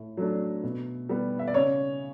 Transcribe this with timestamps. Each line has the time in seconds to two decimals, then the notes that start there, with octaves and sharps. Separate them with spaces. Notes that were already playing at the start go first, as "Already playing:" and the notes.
Already playing: A2
0.17 F#3 A3 D4
0.63 B2
1.09 G3 B3
1.39 E5
1.47 D5
1.54 C#3 C#5